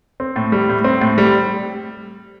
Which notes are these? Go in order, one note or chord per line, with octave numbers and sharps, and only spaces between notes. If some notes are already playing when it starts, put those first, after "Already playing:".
C4
A2
G3
A2
C4
A2
G3